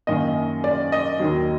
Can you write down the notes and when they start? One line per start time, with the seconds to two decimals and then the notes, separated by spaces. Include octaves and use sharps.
0.07 F#2 D#3 A#3 D#5
0.64 D5
0.92 D#5
1.20 D#2 D#3 F#3